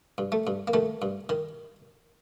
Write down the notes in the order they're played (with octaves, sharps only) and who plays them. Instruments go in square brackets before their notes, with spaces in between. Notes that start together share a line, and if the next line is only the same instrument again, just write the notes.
[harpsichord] G2
A3
G2
A#3
D#3 A3
G2
D#3